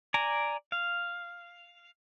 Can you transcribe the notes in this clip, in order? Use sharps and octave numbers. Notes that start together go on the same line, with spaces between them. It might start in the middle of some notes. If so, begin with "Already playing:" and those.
D5 G#5 A#5
F5